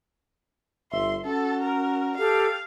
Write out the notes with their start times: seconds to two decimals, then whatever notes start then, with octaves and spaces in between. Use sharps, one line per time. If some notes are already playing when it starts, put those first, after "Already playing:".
0.92 G1 E5 C6
1.25 C#4 F#4 A4
1.62 A#4
2.17 G4 A4 F5